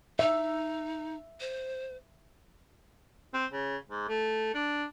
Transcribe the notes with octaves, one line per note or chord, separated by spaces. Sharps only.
D#4 E5
C5
C4
C#3
G#2
A3
D4